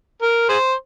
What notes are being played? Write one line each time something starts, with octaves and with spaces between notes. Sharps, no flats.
A#4
G#4 C5